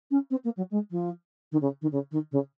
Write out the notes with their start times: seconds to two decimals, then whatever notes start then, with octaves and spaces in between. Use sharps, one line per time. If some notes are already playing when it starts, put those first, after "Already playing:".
0.10 C#4
0.30 C4
0.44 A#3
0.57 F#3
0.71 G#3
0.91 F3
1.51 D#3
1.61 C#3
1.81 D#3
1.92 C#3
2.11 D#3
2.31 C#3